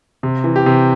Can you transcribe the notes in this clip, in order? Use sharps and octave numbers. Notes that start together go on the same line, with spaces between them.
C3
E3
G4
C3